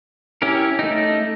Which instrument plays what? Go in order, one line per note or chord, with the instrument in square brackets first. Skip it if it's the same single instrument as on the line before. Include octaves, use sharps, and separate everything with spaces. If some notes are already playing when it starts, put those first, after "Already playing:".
[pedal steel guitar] C#4 E4 G4 A#4
A3 D#4